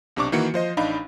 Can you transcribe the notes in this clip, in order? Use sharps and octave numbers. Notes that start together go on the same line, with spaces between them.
B1 C3 D4 C#6 D6
D#3 E3 A#3 F#4 C#7
F3 C5 D#5
A1 D4 D#4 F5 B5